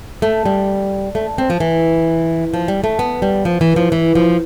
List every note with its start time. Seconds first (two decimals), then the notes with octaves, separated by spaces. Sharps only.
0.22 A3
0.45 G3
1.15 A3
1.38 C4
1.50 F3
1.60 E3
2.54 F3
2.68 G3
2.84 A3
2.99 B3
3.22 G3
3.45 F3
3.61 E3
3.76 F3
3.92 E3
4.15 F3